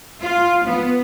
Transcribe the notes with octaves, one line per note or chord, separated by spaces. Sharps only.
F4
B3